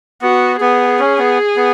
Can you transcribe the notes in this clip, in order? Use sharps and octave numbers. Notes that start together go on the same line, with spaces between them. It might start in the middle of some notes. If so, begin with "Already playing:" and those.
B3 F#4
B3 G#4
C#4
B3
B3